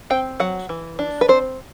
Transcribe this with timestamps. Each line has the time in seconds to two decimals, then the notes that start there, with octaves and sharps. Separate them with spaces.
0.10 C4 G5
0.40 F#3 F#5
0.69 E3
0.99 D4
1.21 B4
1.28 C4 C5